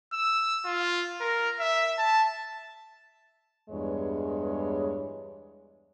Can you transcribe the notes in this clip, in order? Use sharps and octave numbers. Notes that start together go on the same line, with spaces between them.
E6
F4
A#4
E5
A5
E2 G2 G#3 C#5